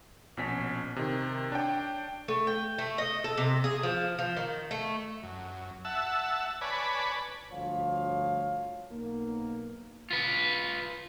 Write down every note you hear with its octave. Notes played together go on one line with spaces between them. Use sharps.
A#1 B2 C#4 B6
C3 D#3
D4 C#5 G5
A3
G5
A3
D#5
A4
C3
G#4
F3
F3
D#3
A3
F#2
E5 F#5 A5 E6
B4 C#5 D5 G#5 A5 B5
D2 G2 F3 C#5 F5
B1 A#3
F4 B4